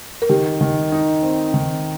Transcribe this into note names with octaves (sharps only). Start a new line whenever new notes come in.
A#4
D#3 G4
D#3
D#4
C4
D#3